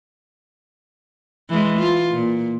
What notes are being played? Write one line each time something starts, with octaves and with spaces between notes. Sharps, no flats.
E3 G#3
F4
A#2